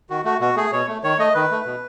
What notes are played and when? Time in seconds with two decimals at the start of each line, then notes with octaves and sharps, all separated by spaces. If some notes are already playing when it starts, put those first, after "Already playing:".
0.10 D#3 F#4
0.25 A3 F#4
0.40 B2 F#4
0.56 A3 G#4
0.72 B2 C#5
0.88 A3
1.04 D#3 C#5
1.19 A3 D#5
1.34 D#3 B4
1.51 A3
1.66 B2